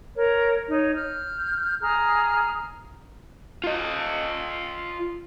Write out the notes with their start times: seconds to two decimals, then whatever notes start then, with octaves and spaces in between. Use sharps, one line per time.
0.16 A#4 C#5
0.69 D#4 C#5
0.95 F6 G6
1.81 G#4 A#5 F6
3.64 F4 D#5